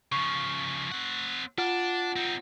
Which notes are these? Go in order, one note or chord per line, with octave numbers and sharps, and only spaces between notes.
C#3 F3 C#6
C4 F#5
D4 F4 F#5 F6
C4 D#4